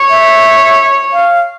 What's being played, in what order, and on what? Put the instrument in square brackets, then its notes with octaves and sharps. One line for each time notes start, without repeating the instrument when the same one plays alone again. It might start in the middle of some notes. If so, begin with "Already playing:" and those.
Already playing: [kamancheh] C#5
[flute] E5
F5